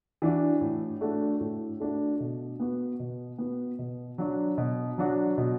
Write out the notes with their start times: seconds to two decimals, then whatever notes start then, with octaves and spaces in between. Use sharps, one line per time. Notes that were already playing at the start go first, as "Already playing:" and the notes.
0.22 E3 D4 F#4
0.61 A2
1.01 A3 D4 F#4
1.40 A2
1.80 A3 D4 F#4
2.20 B2
2.60 B3 F#4
3.00 B2
3.38 B3 F#4
3.79 B2
4.18 F#3 D4 F#4
4.58 B2
4.98 F#3 D4 F#4
5.38 B2